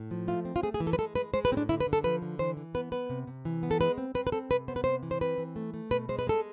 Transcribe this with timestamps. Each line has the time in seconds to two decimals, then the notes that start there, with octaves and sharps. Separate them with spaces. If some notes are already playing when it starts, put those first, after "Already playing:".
Already playing: A2
0.11 F3
0.28 A3 F4
0.45 C4
0.56 F4
0.63 A3 G#4
0.74 G#4
0.80 E3
0.87 A4
0.93 B4
0.98 G#3 A4
1.15 G#3 B4
1.34 G#3 C5
1.45 B4
1.52 A2 C4
1.57 D4
1.69 D3 E4
1.80 B4
1.87 D3
1.93 A4
2.04 F3 B4
2.22 D3
2.39 E3 C5
2.57 E3
2.75 B3 B4
2.92 B3 B4
3.10 C3
3.27 C3
3.45 E3
3.63 B3
3.71 A4
3.80 G#3 B4
3.98 C4
4.15 C4 B4
4.27 B4
4.32 C4 A4
4.50 C3 B4
4.68 B3 C5
4.76 B4
4.84 C3 C5
5.03 E3
5.11 C5
5.21 C4 B4
5.38 E3
5.56 A3
5.74 A3
5.91 B2 B4
6.09 G#3 C5
6.19 B4
6.27 G#3 A4